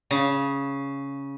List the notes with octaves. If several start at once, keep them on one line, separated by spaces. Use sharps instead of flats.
C#3